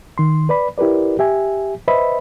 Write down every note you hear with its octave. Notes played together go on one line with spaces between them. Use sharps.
D#3 C6
B4 D5 B5
E4 G4 A#4 B4 D5
G4 E5 G#5
B4 C5 D#5 E5 B5